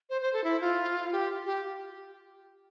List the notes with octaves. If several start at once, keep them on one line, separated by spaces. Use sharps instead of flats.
C5
C5
A4
E4
F4
G4
G4